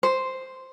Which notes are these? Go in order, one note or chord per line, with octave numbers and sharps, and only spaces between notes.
C5